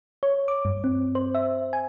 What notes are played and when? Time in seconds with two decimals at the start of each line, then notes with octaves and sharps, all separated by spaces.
0.23 C#5
0.48 D6
0.65 G2
0.84 C4
1.15 C5
1.35 E5
1.73 G#5